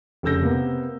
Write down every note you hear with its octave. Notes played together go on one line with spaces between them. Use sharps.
F1 C#3 A4 E6 G6 A#6
C3 A#3 B3